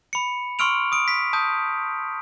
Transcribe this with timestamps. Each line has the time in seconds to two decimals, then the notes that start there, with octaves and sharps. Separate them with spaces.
0.13 B5 C#7
0.59 C6 C#6 E6 F6 D7 F7
0.92 D#6 D7
1.08 B6
1.33 A5 D#6 G6